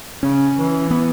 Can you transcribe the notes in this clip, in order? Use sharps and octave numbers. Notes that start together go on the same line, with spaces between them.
C#3 C#4
E3
B3